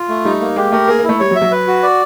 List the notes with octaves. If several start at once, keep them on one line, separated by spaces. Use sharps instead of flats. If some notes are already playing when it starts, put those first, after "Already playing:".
Already playing: F4
A3
G3 D#4
A#3
G#3 G4
A3 A#4
A#3 G#4
A#3
A3 E4
G3 C#5
F#3
E5
F#3
B4
F#4
D5